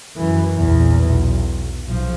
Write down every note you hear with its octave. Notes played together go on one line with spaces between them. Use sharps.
F#2 E3
A#1 E2
B1
B1 F3